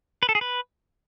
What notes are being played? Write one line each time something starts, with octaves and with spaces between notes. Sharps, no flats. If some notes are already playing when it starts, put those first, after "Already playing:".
B4
A4
G#4
B4